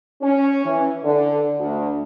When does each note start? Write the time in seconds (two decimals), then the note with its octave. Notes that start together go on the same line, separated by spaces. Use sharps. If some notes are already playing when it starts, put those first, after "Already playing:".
0.21 C#4
0.66 E3
1.04 D3
1.59 D2